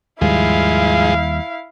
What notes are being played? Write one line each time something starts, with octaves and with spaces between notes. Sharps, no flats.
D#2 G#2 F3 G3 G#3 E4 F5